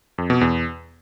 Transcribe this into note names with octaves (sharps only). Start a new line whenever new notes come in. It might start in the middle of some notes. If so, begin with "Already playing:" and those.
F2
B2
E2